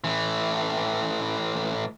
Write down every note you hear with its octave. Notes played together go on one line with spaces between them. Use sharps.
A2 E3